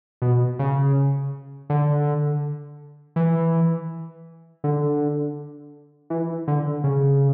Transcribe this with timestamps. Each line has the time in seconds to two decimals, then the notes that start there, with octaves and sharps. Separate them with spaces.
0.22 B2
0.59 C#3
1.70 D3
3.16 E3
4.64 D3
6.10 E3
6.48 D3
6.84 C#3